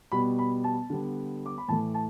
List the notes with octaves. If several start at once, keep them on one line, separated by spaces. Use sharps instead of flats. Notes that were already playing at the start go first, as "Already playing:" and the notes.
B2 G3 B3 B5
B5
A5
D3 G3 B3
D6
B5
A2 E3 A3 A5
A5